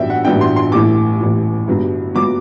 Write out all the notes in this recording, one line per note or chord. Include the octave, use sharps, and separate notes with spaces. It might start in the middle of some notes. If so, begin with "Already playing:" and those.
Already playing: A1 G2 F#3 B3 D4 E5 G5
F#5
A1 G2 F#3 B3 D4 G5
C6
C6
A1 A2 E3 D6
A1 A2 E3
G1 G2 F#3 B3
F#3 B3 D6